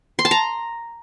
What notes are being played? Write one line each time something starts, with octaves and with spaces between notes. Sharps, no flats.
C6
A5
A#5